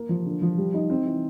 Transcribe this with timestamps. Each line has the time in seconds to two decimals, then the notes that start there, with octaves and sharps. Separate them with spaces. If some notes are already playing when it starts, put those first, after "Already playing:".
Already playing: A#3
0.09 F3
0.26 D3
0.42 F3
0.57 G3
0.74 D#4
0.90 C4
1.06 E3